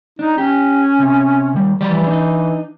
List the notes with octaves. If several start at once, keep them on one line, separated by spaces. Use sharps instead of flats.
D4 D#4
C#4 G4
C3
D#2 G3
E3 F3 G3 D5
D4 D#4